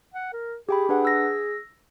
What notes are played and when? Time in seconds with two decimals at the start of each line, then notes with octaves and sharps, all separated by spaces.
0.14 F#5
0.33 A#4
0.69 G4 G#4 G5 B5
0.89 D4 G#4 B4 F#5
1.05 E6 A#6